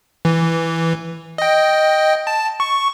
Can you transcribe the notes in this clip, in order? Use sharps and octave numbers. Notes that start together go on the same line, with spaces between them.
E3
D#5 G5
A5
C#6